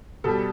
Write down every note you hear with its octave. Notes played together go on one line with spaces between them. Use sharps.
B2 G3 A4